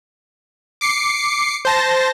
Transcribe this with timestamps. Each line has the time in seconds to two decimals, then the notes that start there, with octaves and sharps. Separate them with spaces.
0.81 D6 C7 C#7
1.65 C5 A5 A#6